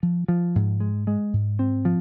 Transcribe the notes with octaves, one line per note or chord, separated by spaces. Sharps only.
F3
F3
G#2
G#3
G#3
G#2
C4
F3